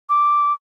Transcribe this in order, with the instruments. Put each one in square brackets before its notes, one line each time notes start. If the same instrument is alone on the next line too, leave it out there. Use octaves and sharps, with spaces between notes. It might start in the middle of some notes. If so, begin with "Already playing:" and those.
[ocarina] D6